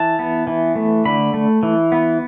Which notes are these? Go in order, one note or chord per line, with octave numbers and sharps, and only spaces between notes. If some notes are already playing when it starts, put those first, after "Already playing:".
Already playing: E3 A5
B3
E3
A3
D3 B5
A3
E3
B3